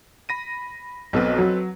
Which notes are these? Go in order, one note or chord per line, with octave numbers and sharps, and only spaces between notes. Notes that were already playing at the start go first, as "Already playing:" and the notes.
B5 A#6 D#7
B1 B2 C4 A4 B4
F#3